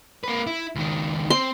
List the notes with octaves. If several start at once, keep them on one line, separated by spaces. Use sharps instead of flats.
A#3 B4
E4
C#2 D#3
C4 C6